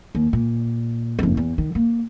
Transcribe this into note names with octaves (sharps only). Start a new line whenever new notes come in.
D#2
A#2
F#1 F2
E2
D#3
A#3